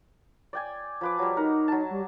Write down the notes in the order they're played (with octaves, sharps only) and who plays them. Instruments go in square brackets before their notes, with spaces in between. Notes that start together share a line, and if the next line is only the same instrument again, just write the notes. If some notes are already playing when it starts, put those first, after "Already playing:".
[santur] D5 G5 G#5
F3 B4 D6
F#3 G3
[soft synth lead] D#4 [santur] A#4 F#5
[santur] F#3 A5
[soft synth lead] G3